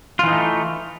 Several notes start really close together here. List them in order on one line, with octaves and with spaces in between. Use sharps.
F4 E3 D#4 A3